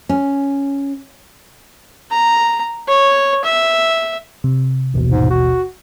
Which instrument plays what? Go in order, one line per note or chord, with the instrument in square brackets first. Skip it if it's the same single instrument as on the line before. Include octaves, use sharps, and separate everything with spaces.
[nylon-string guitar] C#4
[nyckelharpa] A#5
C#5
E5
[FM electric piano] C3
[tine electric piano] A1 D#2 B2
[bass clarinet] G#2
F#4